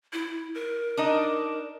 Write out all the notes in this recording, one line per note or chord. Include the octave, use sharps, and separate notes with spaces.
E4
A#4
D4 D#4 D#5